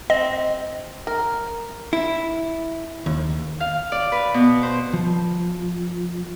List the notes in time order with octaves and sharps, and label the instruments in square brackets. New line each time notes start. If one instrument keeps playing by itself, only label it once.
[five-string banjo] C4 [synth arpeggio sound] D#5
[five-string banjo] A#4
[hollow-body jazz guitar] E4
D#2
[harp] F5
D5
B4
B2
C5
[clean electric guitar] F3